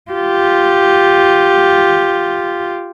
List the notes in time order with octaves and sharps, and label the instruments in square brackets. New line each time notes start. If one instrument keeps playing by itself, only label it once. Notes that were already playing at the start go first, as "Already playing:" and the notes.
[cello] F4 G4